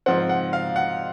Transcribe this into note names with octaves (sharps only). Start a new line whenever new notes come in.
G#2 F3 C4 F#5
F#5
F5
F#5